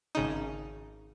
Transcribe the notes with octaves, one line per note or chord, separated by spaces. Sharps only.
G#1 C#3 D#4